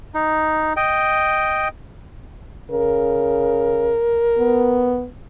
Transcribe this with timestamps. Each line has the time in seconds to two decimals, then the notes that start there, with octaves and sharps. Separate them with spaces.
0.14 D#4
0.77 D#5 G5
2.71 C#3 A#4
4.39 B3